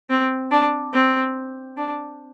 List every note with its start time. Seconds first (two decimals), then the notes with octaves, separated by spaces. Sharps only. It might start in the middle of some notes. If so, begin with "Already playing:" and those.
0.10 C4
0.51 D4
0.93 C4
1.77 D4